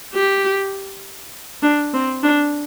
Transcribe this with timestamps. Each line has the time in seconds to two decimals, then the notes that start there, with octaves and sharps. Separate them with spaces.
0.14 G4
1.63 D4
1.93 C4
2.23 D4